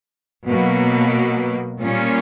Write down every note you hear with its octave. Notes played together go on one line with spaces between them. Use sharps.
B2 F#3 A#3
A#2 G3 A#3 C#4 F4